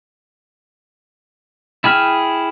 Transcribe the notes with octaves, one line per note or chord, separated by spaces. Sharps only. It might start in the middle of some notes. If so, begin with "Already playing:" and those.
E4 G#4 G5 F6